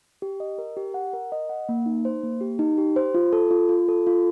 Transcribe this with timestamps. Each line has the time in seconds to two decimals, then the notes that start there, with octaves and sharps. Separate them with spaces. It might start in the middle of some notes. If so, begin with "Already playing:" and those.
0.22 G4
0.40 D#5
0.58 A#4
0.77 G4
0.94 F#5
1.13 A#4
1.32 D#5
1.49 F#5
1.69 A#3
1.86 D#4
2.05 C5
2.23 A#3
2.41 G4
2.59 D#4
2.78 G4
2.96 C5
3.15 F4
3.33 A4
3.51 F4
3.69 F4
3.88 A4
4.07 F4